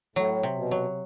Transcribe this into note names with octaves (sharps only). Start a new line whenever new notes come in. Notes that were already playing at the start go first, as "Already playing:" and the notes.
A2 F#3
C3
B2
F#3